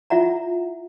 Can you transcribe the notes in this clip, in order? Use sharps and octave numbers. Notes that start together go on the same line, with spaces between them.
E4 F4 E5 F#5 A#5